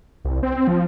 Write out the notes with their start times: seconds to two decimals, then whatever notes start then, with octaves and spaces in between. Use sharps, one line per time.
0.25 C2
0.43 C4
0.55 C4
0.67 F3